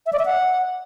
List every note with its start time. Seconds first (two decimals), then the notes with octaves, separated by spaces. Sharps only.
0.06 E5
0.13 D5
0.19 E5
0.26 F#5